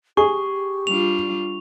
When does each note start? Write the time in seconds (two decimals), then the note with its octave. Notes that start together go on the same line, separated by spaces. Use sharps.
0.17 G4 G#4 C#6
0.87 G3 D4 F4 F7